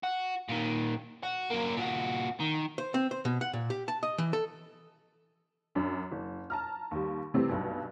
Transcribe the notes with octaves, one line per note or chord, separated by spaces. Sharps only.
F#4
A#2 D#3
F#4
F#3 A#3
A#2 F#4
D#3
C5
C4
C5
B2
F#5
A#2
G4
A5
D#5
E3
A4
F#2 D4
F#1
A5 A#5 F6
D#2 G3
C3 E3 G3 A3 C4
B1 G2 B2